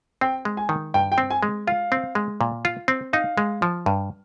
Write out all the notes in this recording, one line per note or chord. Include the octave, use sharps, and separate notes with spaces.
C4 G5
G#3
G#5
D#3
G2 G5
G5
C4
G#5
G#3
F4 F5
C4
G#3
A#2
F4
C4
D#4 F5
G#3
F3
G2